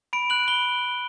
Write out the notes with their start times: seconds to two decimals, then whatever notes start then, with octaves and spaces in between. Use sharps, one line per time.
0.13 B5 D7
0.30 F#6 F#7
0.48 B5 G7